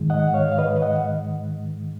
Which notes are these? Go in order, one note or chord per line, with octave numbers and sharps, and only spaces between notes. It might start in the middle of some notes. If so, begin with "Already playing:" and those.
Already playing: G#2 D#3 G#3
D#5 F#5
C#5 F5
F5
B4 D#5
D#5 F#5